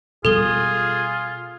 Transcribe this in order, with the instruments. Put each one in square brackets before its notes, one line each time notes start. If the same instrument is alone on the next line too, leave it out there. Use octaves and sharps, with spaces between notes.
[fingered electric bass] B2 G3 [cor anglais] F4 [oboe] G#4 [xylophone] A4 G7